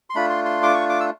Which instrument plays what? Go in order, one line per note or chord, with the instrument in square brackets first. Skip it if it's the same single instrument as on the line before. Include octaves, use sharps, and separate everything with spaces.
[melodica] C6
A3 D4 F4 B5
C6
C6
D6
C#6
D6
E6